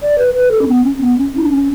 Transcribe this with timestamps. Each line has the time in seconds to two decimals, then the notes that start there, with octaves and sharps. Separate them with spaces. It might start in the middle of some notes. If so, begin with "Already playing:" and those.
0.02 D5
0.18 B4
0.34 B4
0.51 A4
0.62 C#4
0.68 B3
0.84 C#4
1.01 B3
1.18 C#4
1.37 E4
1.44 D4
1.52 C#4